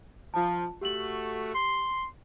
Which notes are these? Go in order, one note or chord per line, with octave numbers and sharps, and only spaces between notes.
F3 F4 A5
A3 F#4 G4 F#7
C6